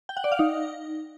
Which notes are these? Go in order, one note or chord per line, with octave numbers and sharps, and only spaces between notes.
G5
F#5
D5
F5
D#4